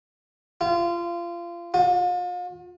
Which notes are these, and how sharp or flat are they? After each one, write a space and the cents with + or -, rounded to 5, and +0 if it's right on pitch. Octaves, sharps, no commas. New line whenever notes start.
F4 -25
F4 +40